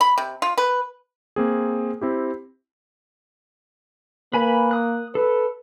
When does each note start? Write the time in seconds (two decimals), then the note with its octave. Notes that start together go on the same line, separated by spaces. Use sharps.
0.01 B5
0.18 C3
0.42 F4
0.58 B4
1.36 A#3 C4 G#4
2.01 C4 E4 G4
4.34 A#3 B4 G#5 B5
4.71 D#6 F#6
5.15 A4 B4